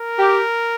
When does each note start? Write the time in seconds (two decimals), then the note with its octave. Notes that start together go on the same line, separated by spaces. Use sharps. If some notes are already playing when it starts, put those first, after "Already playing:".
Already playing: A#4
0.18 G4